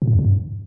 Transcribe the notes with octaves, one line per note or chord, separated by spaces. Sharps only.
B2
A2
F2
C3
G2